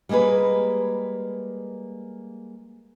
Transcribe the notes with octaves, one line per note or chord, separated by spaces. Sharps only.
G3 G#3 A#3 G#4 B4